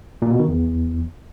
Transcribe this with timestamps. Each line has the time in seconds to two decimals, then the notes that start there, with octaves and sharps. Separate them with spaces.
0.22 A#2
0.31 B2
0.39 D#3
0.48 E2